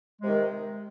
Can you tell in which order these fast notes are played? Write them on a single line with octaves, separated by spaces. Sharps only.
G#3 C3 D#3